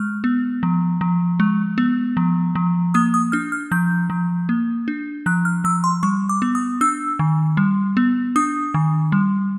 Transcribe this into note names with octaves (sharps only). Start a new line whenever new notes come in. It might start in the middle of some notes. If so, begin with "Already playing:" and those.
Already playing: G#3 F6
B3
F3
F3
G#3
B3
F3
F3
A#3 D#6
D#6
D4 F6
F6
F3 G6
F3
A#3
D4
F3 F#6
F6
F3 E6
C6
G3 C#6
D6
B3
D#6
D4 E6
D#3
G3
B3
D4 D#6
D#3
G3